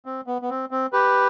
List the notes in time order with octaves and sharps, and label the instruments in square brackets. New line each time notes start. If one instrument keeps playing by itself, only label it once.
[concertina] C4
B3
B3
C4
C4
G4 B4